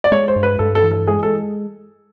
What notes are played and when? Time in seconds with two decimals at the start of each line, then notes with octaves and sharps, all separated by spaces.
0.04 D5
0.11 G#3 C#5
0.28 C5
0.36 G2
0.43 B4
0.59 G2 A4
0.75 A4
0.83 E3
0.91 A4
1.07 G#3 G#4
1.23 A4